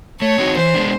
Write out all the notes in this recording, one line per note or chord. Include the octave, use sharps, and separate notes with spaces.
A3 C#5
C4 D#4 F#4
E3 C5
G#3 B3 D4